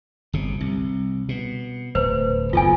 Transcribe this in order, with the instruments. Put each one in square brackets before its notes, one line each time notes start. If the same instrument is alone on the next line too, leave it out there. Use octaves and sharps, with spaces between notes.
[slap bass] G1 C3
C2
B2
[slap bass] D1 [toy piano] B4 C5
[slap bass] F#1 B1 F2 [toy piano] F4 A4 G#5